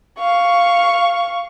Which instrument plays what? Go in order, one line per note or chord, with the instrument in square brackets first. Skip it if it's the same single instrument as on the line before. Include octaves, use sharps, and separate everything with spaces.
[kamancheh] F5 C#6